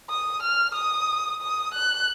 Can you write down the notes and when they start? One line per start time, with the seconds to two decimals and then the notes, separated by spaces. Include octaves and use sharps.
0.10 D#6
0.43 F6
0.75 D#6
1.42 D#6
1.75 F#6